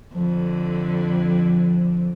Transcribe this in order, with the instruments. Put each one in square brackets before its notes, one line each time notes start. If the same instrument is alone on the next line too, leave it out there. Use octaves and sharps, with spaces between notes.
[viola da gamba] F2 D3 [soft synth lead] F3